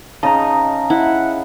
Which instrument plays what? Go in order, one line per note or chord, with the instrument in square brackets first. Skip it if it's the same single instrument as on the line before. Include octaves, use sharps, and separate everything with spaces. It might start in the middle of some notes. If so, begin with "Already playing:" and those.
[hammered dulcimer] C#3 D#4 [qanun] D#5 [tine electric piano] A5 A#5
[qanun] E4 [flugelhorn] F#5